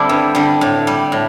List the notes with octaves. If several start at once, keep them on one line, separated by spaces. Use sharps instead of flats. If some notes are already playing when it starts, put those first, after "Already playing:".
Already playing: D3 G3 C4 E4
G2
D3 G3
A2
G3
A2